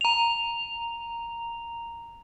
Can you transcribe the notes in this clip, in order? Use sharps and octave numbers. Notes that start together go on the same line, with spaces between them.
A#5 F7